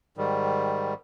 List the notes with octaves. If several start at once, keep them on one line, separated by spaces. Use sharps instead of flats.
G#2 D#3 G3